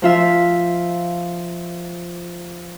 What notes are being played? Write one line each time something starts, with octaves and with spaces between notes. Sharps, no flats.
F3 F4 E5